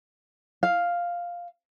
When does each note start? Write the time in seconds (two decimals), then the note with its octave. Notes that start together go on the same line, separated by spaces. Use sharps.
0.63 F5